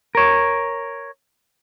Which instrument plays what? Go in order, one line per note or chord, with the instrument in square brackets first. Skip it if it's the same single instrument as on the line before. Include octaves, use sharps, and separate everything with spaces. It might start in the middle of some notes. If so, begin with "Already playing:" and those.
[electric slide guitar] A#4 C#5